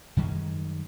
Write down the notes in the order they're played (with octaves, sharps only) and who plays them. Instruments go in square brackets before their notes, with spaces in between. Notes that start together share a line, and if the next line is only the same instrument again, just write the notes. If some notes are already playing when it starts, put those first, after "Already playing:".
[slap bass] F#2 D#3 G3 G#3